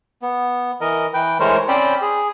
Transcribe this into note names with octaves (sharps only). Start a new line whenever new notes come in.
B3
E3 A#4 D#5
E3 B4 G5
E3 G#3 A3 A#4 C5 C#5
C4 C#4 C5 D5 G5 B5
G#4